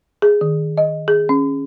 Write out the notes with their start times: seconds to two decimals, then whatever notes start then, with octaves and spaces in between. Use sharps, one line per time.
0.22 G#4
0.41 D#3
0.77 D#5
1.08 G#4
1.29 C#4